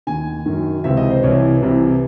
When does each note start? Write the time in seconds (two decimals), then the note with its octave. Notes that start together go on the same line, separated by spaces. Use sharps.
0.07 D#2 D#3 G#5
0.46 F#2 D#3
0.84 C#2 C3 E3 E5
0.97 D#5
1.10 C5
1.23 C2 C3 E3 C#5
1.62 C2 C3 E3